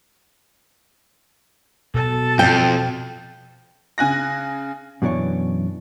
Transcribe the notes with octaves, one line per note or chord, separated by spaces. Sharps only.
B2 A4 A5
F2 G5
C#3 G#5 F#6 A#6
F#2 B2 E3 D4 C#5